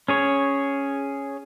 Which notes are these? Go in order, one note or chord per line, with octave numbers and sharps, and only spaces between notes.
C#4 G#4 C#5